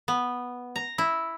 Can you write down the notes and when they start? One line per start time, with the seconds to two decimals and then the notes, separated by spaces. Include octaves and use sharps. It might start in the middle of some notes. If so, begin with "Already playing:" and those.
0.08 B3
0.76 A#5
0.98 E4